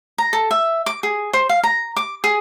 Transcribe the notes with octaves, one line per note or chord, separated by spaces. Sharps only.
A#5
A4
E5
D6
G#4
C5
F5
A#5
D6
G#4